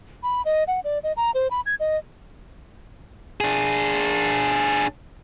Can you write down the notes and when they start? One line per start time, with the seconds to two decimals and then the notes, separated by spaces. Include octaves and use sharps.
0.23 B5
0.45 D#5
0.68 F#5
0.84 D5
1.03 D#5
1.17 A#5
1.34 C5
1.51 B5
1.66 G#6
1.80 D#5
3.41 D4 G#4